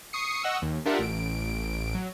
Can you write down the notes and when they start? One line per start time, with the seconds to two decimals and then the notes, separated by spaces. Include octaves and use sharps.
0.13 C#6 D#6 C7 C#7
0.43 D#5 F#5 C#6 E6
0.62 D#2
0.85 D4 F4 G4 A#4 E5 F#5
0.99 A1 D7
1.94 F#3